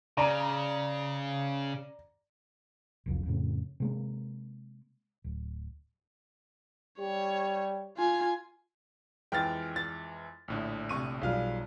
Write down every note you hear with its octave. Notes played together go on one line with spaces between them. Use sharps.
C#3 D5 A#5
F#1 C2 F2
F2 A2 C#3
C3 G#3 A#3
D1
G3 C#5
F4 G#5
F2 E3 G#3 G5 F6 A6
A6
A#1 A2 D3
C3 C#6 D#7
B1 F3 G3 G#4 F5 F6